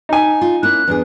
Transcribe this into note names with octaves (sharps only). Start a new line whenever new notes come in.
D#4 G#5
F4
A#3 C#4 E4 F#6
E2 D4 G#4